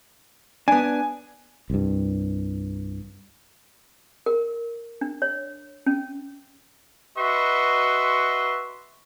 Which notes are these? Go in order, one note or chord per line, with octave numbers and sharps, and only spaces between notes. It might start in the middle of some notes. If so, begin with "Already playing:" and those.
B3 D4 G#5
C2 G2
A#4
D4
C#5
C#4
F#4 B4 D#5 E5 C6 C#6